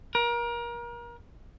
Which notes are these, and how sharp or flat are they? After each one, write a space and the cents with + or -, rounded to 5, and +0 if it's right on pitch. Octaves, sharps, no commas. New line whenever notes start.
A#4 +30